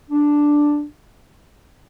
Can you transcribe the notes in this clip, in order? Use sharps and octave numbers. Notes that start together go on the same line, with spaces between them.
D4